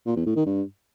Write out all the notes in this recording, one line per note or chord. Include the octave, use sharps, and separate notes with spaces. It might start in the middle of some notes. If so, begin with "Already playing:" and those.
A#2
E2
A2
D#3
G2